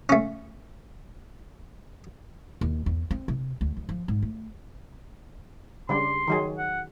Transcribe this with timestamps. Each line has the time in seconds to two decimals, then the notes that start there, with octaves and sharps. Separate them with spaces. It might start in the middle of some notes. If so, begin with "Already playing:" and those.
0.09 A3 C#4
2.61 D#2
2.86 E2
3.11 C4
3.28 C3
3.61 D2
3.77 D2
3.89 F3
4.08 G#2
4.22 A3
5.89 C#3 G3 D4 C6
6.28 D#3 F#3 G#4
6.57 F#5